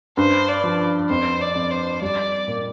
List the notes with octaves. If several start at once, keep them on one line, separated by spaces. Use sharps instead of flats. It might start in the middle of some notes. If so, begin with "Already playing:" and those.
G2 C5
D5
F3
F2 C5
D5
F2
C5
G3 D5
A#2